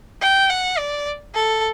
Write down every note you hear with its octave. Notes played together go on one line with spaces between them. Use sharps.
G5
F#5
D5
A4